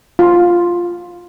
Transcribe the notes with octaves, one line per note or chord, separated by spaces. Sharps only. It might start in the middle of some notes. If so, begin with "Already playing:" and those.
F4